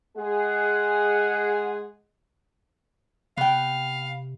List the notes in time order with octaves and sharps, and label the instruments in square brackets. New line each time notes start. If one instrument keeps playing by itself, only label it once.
[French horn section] G#3 G#4 [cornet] F#5
[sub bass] C3 [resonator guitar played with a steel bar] B3 G5 [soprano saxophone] F5